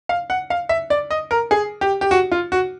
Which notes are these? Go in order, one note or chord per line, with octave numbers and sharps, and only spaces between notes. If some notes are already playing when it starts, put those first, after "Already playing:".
F5
F#5
F5
E5
D5
D#5
A#4
G#4
G4
G4
F#4
F4
F#4